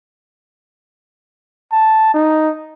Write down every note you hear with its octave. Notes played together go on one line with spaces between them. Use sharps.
A5
D#4